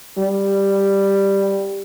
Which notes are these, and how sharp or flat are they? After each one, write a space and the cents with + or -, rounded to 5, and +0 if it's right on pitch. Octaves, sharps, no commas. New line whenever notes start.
G3 +5